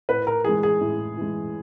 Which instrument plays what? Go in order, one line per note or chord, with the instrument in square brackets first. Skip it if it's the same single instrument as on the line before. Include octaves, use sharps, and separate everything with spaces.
[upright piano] A2 [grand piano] B4
[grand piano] A#4
[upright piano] E3 G#3 [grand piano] G#4
[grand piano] G#4
[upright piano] A2
E3 G#3